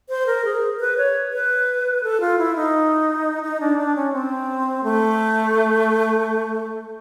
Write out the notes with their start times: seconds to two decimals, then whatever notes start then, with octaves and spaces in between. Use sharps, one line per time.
0.09 C5
0.26 A#4
0.45 G#4
0.80 B4
0.97 C#5
1.32 B4
2.03 A4
2.20 F4
2.38 E4
2.55 D#4
3.43 D#4
3.60 D4
3.78 D4
3.96 C#4
4.13 C4
4.83 A3